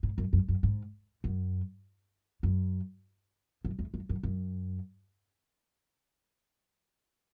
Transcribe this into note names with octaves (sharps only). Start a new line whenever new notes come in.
G#2
F#2
F#2
F#2
G#2
F#2
F#2
F#2
E2
F#2
F#2
F#2